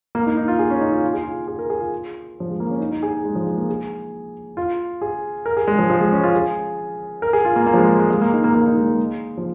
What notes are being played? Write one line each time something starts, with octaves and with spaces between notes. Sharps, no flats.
A#3
D#4
D#4
F4
G#4
C#4
D#4
F4
F4
G#4
F4
G#4
A#4
G#4
F4
F3
G#3
A#3
C#4
D#4
D#4
G#4
G#4
G#3
F3
G#3
A#3
G#4
F4
G#4
A#4
G#4
G#3
F3
F3
G#3
C#4
F4
G#4
A#4
G#4
F4
A#3
A#3
F3
G#3
G#3
G#3
G#3
A#3
D#4
A#3
A#3
D#4
G#3
G#3
F3